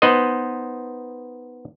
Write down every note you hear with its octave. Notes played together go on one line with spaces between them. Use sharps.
B3 D#4 B4 C5 D#5